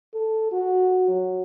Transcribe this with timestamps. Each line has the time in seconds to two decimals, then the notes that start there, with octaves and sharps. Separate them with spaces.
0.14 A4
0.52 F#4
1.08 F#3